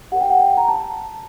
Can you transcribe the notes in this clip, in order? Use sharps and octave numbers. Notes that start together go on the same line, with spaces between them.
G4 A#4 C#5 F#5
G5
F#5
G5
A#5
A5